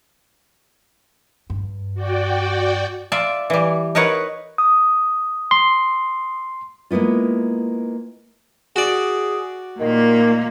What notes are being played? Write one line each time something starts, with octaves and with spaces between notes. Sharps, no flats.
G2
F#4 D5 G5
F4 D5 E5
E3 G3
D#4 A#4 B4 C#5 F#5
D#6
C6
G#3 A#3 B3 E4 F4
F#4 G#4 D5
A#2 D#3 A#3